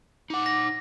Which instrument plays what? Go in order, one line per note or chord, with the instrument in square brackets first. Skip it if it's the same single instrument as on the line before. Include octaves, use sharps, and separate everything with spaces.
[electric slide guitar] D#4 F#5 [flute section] D6
[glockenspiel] A#6